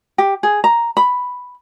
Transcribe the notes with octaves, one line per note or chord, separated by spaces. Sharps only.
G4
G#4
A#5
B5